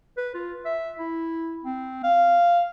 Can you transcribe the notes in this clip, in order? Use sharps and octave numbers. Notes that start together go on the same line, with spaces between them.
B4
F4
E5
E4
C4
F5